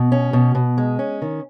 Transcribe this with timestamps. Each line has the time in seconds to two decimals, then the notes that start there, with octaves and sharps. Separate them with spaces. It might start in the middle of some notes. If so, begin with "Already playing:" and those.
Already playing: B2
0.12 C#4
0.33 B2
0.55 B2
0.78 G#3
0.99 C#4
1.22 D#3